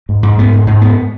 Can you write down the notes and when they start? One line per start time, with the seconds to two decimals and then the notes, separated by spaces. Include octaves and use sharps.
0.09 G#2
0.23 G#2
0.38 G#2 B3
0.53 G#2
0.67 G#2
0.81 G#2 B3